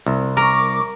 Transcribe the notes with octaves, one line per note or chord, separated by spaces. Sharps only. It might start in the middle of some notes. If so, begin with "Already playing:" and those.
C2
A#4 C#6 D6